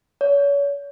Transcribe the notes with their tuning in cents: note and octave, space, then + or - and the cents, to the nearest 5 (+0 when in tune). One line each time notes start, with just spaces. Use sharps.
C#5 +35